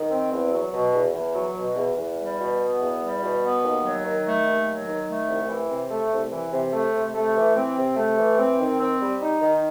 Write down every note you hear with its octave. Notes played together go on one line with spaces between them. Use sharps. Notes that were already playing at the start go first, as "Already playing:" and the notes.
Already playing: D#3
C4
E2
F#3
B2
E2
E2
F#3
B2
E2
E2
G3
B2
B3
E2
G3
B2
B3
D#2
F#3
D#3
A3
D#2
F#3
D#3
A3
C2
E3
C3
A3
C2
E3
C3
A3
C3
A3
E3
C4
C3
A3
E3
C4
D#3
C4
G3
D#4
D#3